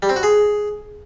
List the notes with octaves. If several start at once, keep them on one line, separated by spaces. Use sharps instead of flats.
G3
C4
F#4
G#4